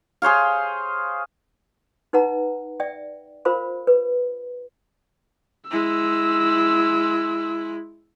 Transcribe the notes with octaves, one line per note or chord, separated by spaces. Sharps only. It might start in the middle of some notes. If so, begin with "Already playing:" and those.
G#4 C5 C#5 F5
D#4 B4 F#5 A#5
D5 E5 G5
F4 A#4 C5 F5 B5
B4
G#3 E4 E6